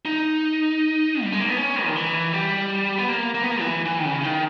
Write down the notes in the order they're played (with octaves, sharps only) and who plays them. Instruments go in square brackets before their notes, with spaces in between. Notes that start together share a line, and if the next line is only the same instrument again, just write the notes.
[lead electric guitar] D#4
G3
G#3
A#3
B3
C#4
D#3
E3
G3
B3
A#3
A#3
B3
A#3
E3
E3
D#3
C#3
D#3